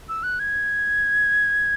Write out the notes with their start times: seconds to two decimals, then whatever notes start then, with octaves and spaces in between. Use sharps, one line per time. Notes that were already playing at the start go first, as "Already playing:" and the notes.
0.09 E6
0.23 F#6
0.39 G#6